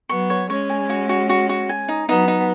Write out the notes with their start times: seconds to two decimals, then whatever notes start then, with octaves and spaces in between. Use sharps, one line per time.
0.09 F#3 B3 C#6
0.30 C#5
0.50 G#3 C#4 C#5
0.70 G#5
0.90 F#4
1.09 F#4
1.29 F#4
1.49 F#4
1.69 G#5
1.89 D#4
2.08 F#3 B3 D#4
2.28 D#4